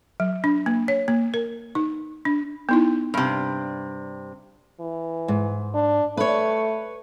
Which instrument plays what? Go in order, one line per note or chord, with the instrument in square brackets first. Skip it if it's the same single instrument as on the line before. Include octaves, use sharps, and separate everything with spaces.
[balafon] F#3
D4
A#3
C#5
A#3
A#4
D#4
D4
B3 D#4 E4
[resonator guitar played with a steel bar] G2 C3
[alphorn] E3
[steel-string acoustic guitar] G#2
[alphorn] D4
[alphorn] A3 [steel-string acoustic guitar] B4 C#5